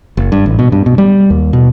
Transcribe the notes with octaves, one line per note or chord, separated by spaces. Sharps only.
F#1
G2
A1
B2
G2
B2
G3
D#2
B2